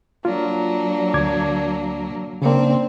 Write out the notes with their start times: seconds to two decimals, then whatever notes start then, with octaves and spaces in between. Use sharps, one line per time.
0.25 F#3 A#3 D4 F4
1.14 D2 D6 G#6
2.42 C#3 A#3 C4 D4